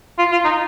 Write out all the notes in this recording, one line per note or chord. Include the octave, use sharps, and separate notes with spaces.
F4
F4
D#4